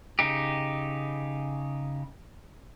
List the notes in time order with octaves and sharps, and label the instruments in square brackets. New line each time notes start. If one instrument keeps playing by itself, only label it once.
[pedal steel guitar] C#3 D#4 G4